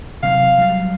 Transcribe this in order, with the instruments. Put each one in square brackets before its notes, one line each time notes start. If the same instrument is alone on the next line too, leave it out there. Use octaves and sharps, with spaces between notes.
[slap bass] C3 F#3 [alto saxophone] F5
[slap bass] F#3 G3